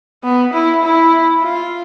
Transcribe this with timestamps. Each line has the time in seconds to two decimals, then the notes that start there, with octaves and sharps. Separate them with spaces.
0.24 B3
0.53 E4
0.83 E4
1.43 F4